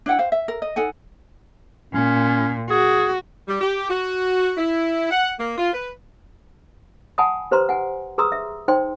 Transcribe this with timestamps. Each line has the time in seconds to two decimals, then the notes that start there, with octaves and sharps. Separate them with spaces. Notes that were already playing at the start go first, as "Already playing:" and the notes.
0.06 D4 E4 F#5 G5
0.19 C5 F5
0.32 E5
0.48 A#4
0.62 D#5
0.76 D#4 A4 F#5 G#5
1.94 A#2 C#4
2.70 F#4 G#4
3.48 G3
3.61 G4
3.90 F#4
4.58 E4
5.11 F#5
5.39 A#3
5.58 F4
5.73 B4
7.18 F#5 G#5 A5 B5 D#6
7.51 G4 B4 C5 A#5 C6
7.69 F#5 G#5
8.18 G#4 B4 A#5 C6 D#6 E6
8.32 E5
8.68 D#4 C5 G5 C6